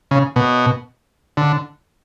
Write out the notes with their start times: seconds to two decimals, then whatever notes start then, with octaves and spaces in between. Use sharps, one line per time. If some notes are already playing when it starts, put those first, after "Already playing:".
0.11 C#3
0.36 B2
1.37 D3